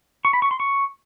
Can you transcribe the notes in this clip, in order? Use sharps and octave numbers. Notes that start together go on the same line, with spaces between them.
C#6
B5
C#6
C6
C#6